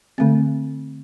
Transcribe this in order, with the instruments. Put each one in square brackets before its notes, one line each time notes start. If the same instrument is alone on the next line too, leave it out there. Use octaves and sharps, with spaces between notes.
[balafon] D3 A3 C4